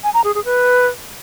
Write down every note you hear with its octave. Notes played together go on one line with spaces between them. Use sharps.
G#5
A#5
G#4
G#4
B4